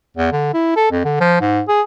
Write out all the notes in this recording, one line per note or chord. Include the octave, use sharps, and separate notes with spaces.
E2
D3
E4
A4
F2
D3
F3
G#2
G#4